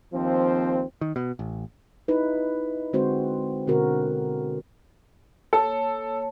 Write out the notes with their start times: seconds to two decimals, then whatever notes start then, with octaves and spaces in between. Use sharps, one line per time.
0.13 D#2 F3 C4
1.01 D#3
1.16 B2
1.39 A1
2.08 D#4 E4 B4
2.93 D3 G#3 C4 F#4 C5
3.67 B2 D3 C4 F#4 A#4
5.53 A#3 A4 C#5 A5